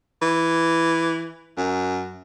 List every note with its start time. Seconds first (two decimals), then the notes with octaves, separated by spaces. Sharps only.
0.22 E3
1.57 F#2